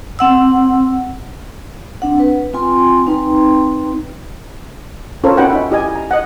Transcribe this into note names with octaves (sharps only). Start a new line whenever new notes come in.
C4 F#5 E6
C4 D4 F#5
B4
C4 F4 G5 G#5 C6
C4 D#4 B4 G5 A#5 C6
C#4 F4 A4 A#4 C5 C#5
C#4 D#4 F#4 B4 F#5 G5
D#4 E5
E4 G4 D#5 G#5
A#5
D#5 F#5